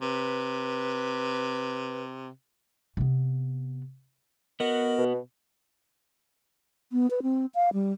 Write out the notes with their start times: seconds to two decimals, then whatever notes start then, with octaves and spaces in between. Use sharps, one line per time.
0.02 C3 B4
2.97 C3 B3
4.60 B3 F#4 A#4 D#5
4.98 B2
6.92 B3
7.10 B4
7.23 C4
7.55 F5
7.73 G3